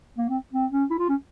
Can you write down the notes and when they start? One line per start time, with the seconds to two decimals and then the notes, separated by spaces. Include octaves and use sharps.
0.18 A#3
0.29 C4
0.53 C4
0.72 C#4
0.90 E4
0.98 F4
1.09 C#4